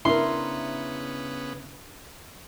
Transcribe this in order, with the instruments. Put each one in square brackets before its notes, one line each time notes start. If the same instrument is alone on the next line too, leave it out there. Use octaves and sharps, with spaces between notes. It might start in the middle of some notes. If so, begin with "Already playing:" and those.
[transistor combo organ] C#3 B3 [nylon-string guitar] D4 A#4 [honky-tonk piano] E4 [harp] C6